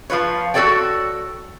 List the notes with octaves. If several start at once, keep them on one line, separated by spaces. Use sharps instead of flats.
F3 F4 B4 C#5
F#4 G#4 A4 C#5 D5 G5